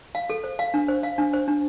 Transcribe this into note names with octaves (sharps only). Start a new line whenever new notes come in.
F5
A4
C5
F5
D4
C5
F5
D4
C5
D4